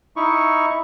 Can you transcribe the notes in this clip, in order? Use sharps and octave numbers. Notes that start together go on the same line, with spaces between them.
D#4 E4 C#6